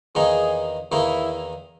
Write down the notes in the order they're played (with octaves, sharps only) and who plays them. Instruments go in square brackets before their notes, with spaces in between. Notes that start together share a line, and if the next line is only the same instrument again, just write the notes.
[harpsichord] E2 D#3 A#3 D#4 [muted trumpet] G#4
[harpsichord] E2 D#3 A#3 D#4 [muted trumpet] E4